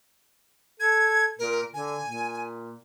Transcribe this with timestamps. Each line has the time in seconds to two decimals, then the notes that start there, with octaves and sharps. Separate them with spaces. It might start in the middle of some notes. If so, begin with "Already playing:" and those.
0.80 A4 G#6
1.39 A#2 A#4
1.74 D3 G#5
2.03 A#2